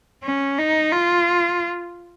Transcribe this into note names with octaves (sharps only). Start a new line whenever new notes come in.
C#4
D#4
F4